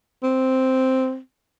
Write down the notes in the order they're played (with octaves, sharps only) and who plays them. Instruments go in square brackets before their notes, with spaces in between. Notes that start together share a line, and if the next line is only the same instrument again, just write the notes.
[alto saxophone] C4